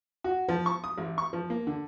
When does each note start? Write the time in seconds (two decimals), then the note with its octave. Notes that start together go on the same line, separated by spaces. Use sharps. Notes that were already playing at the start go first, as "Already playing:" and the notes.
0.24 F#4
0.49 F3
0.66 C#6
0.84 D#6
0.98 A1
1.18 C#6
1.33 F3
1.50 A#3
1.67 D3